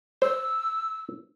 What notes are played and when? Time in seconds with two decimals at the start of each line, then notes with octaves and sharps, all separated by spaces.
0.22 C5 E6